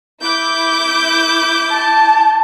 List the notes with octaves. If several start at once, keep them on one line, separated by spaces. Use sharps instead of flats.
E4 D6 G6
A5